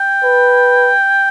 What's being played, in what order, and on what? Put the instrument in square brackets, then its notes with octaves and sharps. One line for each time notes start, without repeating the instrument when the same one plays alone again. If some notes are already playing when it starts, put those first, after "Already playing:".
Already playing: [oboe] G5
[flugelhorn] B4